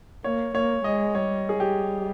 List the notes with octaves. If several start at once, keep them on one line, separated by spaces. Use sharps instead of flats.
A#3 C#5
A#3 C#5
G#3 D#5
G3 C#5
G#4
G3 G4